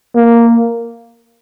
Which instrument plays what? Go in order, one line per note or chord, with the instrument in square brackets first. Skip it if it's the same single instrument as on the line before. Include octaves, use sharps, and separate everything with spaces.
[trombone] A#3